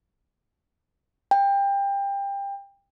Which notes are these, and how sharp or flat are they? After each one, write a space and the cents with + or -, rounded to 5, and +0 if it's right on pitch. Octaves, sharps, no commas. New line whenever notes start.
G5 +25